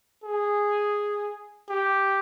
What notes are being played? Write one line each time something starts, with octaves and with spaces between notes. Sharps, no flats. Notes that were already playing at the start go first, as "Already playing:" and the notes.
G#4
G4